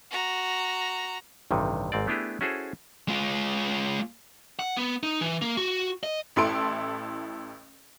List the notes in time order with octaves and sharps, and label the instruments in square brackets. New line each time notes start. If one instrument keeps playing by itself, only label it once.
[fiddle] F#4 A#5
[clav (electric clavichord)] A1 G2 C3 D#3
G#1 G#2 C4 D5
A3 B3 D4 E4 G4 G#4
C#4 E4 F#4 G#4 A4 C5
[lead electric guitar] G#3 F4
F#5
B3
D#4
E3
A#3
F#4
D#5
[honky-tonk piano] A1 E4 A4 C6 D7